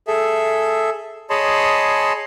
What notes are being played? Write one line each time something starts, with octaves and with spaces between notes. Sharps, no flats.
G#4 A4 E5
G#4 C#5 D#5 A5 B5 C6